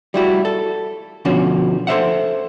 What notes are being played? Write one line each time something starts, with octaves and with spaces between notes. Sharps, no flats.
G3 E4 F#4
A4
B2 D3 F3 C#4 F#4
A4 C5 E5 F#5